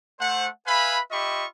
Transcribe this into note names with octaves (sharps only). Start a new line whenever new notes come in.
A3 C5 F#5
B4 E5 F5 G#5 B5
F4 G4 D#5 E5 B5 C#6